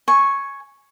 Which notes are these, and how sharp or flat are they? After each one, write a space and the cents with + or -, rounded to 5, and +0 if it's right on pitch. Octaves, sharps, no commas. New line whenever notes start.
G#5 +10 C#6 -5